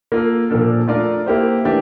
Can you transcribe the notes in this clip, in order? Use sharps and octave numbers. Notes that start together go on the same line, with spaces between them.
A#3 F4 A4
A#2 F3 A#3 D4 A4
A3 D4 F4 A#4 D5
A#3 E4 G4 C5
E3 A3 D4 G4